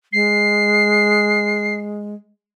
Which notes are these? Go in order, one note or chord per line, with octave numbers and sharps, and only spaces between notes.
G#3 C7